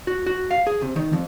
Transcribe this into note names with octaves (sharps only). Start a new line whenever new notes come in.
F#4
F#4
F5
G#4
C3
D#3
F2